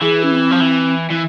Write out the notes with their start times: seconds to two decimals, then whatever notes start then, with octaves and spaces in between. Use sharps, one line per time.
0.01 E3 G#4
0.24 C#4
0.31 C4
0.51 F3
0.61 E3
1.10 E3